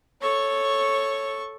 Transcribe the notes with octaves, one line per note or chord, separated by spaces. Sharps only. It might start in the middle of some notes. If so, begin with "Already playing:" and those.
A4 C#5 C#6